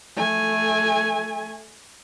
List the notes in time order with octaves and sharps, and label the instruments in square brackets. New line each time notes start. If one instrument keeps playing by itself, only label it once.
[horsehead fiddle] A3 G#5